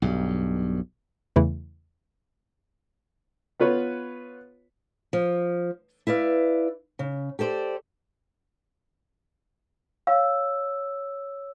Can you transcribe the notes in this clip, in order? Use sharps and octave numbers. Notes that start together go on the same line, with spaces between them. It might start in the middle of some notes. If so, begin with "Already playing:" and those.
B1 G2
E2 C#3 E3 A3 E4
B3 F4 B4 C#5
F3
E4 B4 D5 F5
C#3
G4 A4 C5 D5
C#5 F5 E6